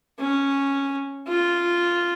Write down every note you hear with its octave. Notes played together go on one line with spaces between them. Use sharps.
C#4
F4